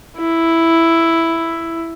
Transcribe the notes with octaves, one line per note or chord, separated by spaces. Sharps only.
E4